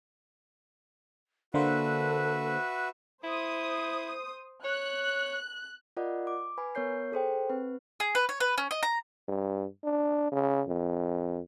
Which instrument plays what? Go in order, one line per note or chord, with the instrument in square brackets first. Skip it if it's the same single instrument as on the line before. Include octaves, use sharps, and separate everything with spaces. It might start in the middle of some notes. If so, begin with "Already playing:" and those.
[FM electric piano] D3 A#3 C5 [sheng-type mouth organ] F#4 B4 E5 [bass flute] A4
[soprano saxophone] E4 [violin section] C5 D#6
[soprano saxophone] C#5 [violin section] F#6
[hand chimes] F4 A#4 D5 D#5 F#5
D6
B4 G#5 B5
B3 A#4 C#5 G6 C7
G#4 A4 C5 G5
C4 B4
[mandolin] G#4
B4
C#5
B4
C#4
D#5
A#5
[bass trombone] G2
D4
C#3
F2